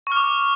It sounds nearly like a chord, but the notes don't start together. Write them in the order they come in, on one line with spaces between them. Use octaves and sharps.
C#6 F6 D6